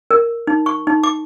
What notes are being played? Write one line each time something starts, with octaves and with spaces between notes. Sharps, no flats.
A#4
D#4
C#6
D#4
D6